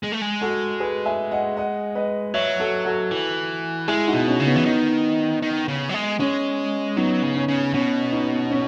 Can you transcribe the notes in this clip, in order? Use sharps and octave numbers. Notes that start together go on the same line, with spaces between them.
G#3
A3
G#3
F#4 A4
G#4 B4
E5 G#5
D#5 F#5
D#5 F#5
B4 D#5
F#3 C#5 E5
F#4 A4
F#4 A4
E3
G#3 E4 G#4
D#4 F#4
B2
C#4 E4
C#3
B3 D#4
E3
D#3
D#3
C#3
F#3
G#3
G#3 C#4
F#3 B3 D#4
C#3
C#4
C#3
B2 C#4
B3 D#4
C#4